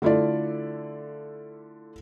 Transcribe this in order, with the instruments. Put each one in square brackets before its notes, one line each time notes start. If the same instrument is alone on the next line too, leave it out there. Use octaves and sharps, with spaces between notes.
[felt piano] D3 A3 E4 F4 D5